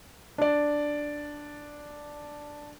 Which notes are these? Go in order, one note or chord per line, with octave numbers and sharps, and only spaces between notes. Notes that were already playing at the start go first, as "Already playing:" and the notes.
D4 D5